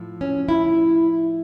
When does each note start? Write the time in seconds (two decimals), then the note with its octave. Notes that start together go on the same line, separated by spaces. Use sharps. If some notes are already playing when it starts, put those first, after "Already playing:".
Already playing: A2 F3
0.21 C#4
0.49 E4